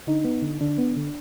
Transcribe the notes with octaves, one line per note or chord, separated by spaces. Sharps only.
D3 D#4
B3
D3
D3 D4
B3
D3